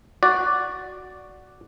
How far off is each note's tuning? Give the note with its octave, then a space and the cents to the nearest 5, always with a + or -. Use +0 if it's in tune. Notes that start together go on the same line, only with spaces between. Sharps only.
F#4 +0 D5 +0